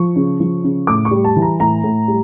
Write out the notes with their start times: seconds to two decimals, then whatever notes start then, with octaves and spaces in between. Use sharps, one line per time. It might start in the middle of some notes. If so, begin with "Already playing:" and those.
Already playing: F3 C#6
0.16 C#3
0.40 F3
0.64 C#3
0.87 A2 D6
1.05 C#6
1.11 G3
1.24 A5
1.36 E3
1.42 A#5
1.60 A2 A#5
1.84 A2
2.08 G3